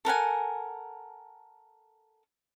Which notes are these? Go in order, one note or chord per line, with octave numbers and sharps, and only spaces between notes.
A4 A#4 F#5 G#5